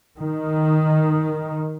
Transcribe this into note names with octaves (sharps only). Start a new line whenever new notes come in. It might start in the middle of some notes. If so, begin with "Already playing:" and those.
D#3